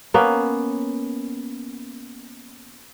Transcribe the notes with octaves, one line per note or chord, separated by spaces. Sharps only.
A#3 B3 C#4